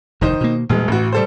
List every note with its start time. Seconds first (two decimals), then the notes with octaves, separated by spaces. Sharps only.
0.21 F1 D#2 D#3 D#4 C5
0.41 B2 A#3
0.69 E1 A#2 E3 G3 G#3
0.88 A1 A2 F#4
1.12 G3 A4 C5